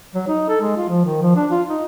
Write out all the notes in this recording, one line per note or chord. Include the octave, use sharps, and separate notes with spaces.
F#3
D#4
A4
G#3
F4
F3
D#3
F3
D4
F4
D#4